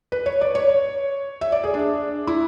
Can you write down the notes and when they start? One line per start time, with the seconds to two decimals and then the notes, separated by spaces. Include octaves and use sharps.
0.12 B4
0.26 C#5
0.41 D5
0.55 C#5
1.41 E5
1.52 D5
1.64 G#4
1.74 D4
2.27 E4